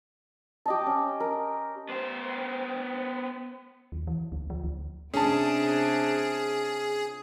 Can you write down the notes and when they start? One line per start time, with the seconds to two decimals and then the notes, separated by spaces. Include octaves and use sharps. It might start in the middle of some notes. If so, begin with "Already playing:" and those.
0.66 G4 D#5 A5
0.86 C#4
1.20 A#4
1.89 B3 C5
3.92 D#2
4.07 E3
4.32 D2
4.50 F3
4.64 D2
5.14 C3 C#4 D4 G#4 A5